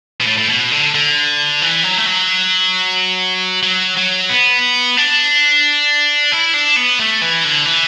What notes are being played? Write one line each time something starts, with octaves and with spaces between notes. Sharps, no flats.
B2
A2
A2
B2
D3
D3
E3
F#3
A3
F#3
F#3
F#3
B3
D4
E4
D4
B3
A3
E3
D3
E3